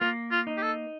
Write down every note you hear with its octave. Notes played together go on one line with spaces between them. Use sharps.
A#3 F4
F4
D#4
G4
A4